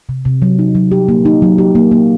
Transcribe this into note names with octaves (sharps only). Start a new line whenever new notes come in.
C3
C3
F#3
D#4
F#3
G4
A#3
D#4
F#3
G4
A#3
A#3